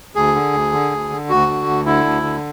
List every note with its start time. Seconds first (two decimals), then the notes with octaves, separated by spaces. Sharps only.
0.15 D2 G#4
0.34 D3
0.53 D2
0.72 D3
0.91 D2
1.10 D3
1.29 D2 F#4
1.47 D3
1.66 D2
1.85 D3 E4
2.04 D2
2.23 D3